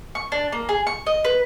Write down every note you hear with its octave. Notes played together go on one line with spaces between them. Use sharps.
C#6
D4
A#3
G#4
C#6
D#5
B4